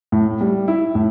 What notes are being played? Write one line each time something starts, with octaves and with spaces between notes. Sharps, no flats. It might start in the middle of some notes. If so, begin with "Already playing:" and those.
A2
G3
E4
A2